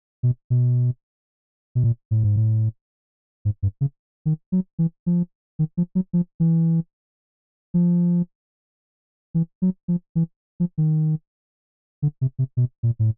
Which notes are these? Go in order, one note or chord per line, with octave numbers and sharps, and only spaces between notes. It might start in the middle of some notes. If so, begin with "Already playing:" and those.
B2
B2
B2
A#2
A2
G#2
A2
G#2
G2
C#3
D#3
F#3
E3
F3
D#3
F3
F#3
F3
E3
F3
E3
F#3
F3
E3
F3
D#3
D3
C3
C3
B2
A#2
A2